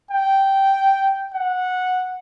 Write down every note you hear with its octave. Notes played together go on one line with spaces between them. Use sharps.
G5
F#5